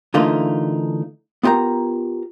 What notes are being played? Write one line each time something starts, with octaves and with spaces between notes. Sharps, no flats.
D3 E3 A3 A#3 D#4 F4
B3 F4 G4 A#4 A#5